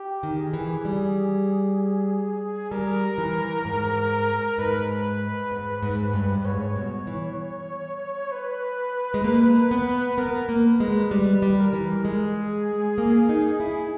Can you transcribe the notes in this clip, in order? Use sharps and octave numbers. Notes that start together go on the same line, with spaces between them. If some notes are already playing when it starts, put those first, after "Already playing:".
Already playing: G4
D#3
G#4
E3
G3
G3 A#4
E3
G#2
G#2 B4
G#2
G#2
G2
G#2 C#5
B2
E3
B4
G#3
A#3
B3
B3 A#4
A#3
B4
G#3
G3 B4
G3
A#4
E3
G#3 G#4
A#3
D#4
E4